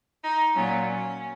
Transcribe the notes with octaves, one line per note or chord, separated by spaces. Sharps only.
D#4
A#2 F#3 C#4
C#4